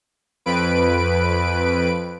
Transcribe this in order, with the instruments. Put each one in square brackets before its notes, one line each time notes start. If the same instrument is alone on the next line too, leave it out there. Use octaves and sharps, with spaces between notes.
[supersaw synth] F2 B4 D7